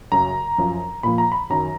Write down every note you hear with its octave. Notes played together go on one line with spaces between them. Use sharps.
F#2 C#3 F#3 A#5
F#2 F3
A#2 F3 B5
A#5
B5
F#2 D#3 F#3 A#5